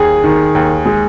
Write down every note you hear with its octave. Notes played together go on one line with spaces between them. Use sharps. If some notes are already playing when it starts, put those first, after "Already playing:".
Already playing: D#2 G#4
D#3
D#2
G#3